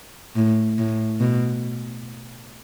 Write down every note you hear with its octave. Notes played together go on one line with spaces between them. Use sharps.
A2
A2
B2